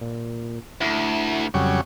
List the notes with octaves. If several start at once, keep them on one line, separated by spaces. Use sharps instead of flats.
A#2
D2 E4
F2 C#3 F#3 G3